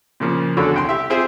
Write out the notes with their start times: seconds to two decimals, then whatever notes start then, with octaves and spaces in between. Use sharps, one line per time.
0.20 A#2 C#3 F3 A#3
0.57 E2 D3 F#4 A4 C#5 B5
0.74 C2 G5 C6
0.89 G4 E5
1.10 C4 F4 G#4 C5 E5